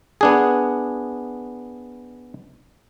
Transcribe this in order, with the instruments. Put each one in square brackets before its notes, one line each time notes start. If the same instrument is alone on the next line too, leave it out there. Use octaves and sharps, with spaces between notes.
[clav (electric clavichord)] B3 D4 G#4